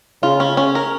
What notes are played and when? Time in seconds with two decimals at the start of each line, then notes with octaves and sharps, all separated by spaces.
0.23 C#3 F4
0.40 C#4
0.57 C#4
0.75 A#4